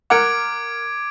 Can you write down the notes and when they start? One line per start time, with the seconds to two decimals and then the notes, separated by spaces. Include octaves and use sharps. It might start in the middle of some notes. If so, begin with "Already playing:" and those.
0.10 A#4 F#5 D6 G#6 D7